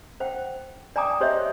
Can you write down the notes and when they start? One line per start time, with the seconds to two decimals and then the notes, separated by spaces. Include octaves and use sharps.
0.20 C5 F#5 G5
0.96 D5 G5 G#5 A#5 D6 D#6
1.21 G4 C5 C#5 D#5 E5